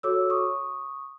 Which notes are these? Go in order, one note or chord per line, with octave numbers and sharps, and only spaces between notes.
F#4 A4 C#5 D6 E6
C#6 D#6